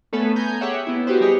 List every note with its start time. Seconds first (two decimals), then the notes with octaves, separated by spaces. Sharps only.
0.12 A3 B3 C#4 A4 B4
0.36 G#5 A#5 G6
0.61 G4 G#4 C#5 E5 F#5
0.86 B3 E4
1.07 F#4 G4 B4 C5
1.21 G3 G4 G#4 C#5 D#5